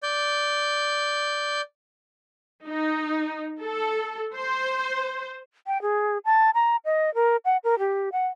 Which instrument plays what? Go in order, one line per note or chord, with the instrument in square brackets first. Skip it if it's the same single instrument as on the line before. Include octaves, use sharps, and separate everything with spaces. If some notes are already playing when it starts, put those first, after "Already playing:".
[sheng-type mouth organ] D5 G6
[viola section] D#4
A4
C5
[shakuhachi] G5
G#4
A5
A#5
D#5
A#4
F#5
A#4
G4
F#5